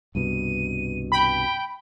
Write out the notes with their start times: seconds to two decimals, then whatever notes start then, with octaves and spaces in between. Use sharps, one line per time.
0.15 C2 G2 B2 D#7
1.12 G5 B5